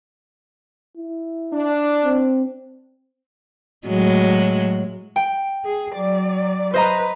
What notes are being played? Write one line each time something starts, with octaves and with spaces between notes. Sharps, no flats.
E4
D4
C4
A2 F#3 G#3
G5
G#4
F#3 D5
B4 C5 D#5 A#5